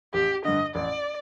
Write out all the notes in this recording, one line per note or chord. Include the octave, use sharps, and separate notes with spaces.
A1 G4
G2 D3 D#5
A1 D5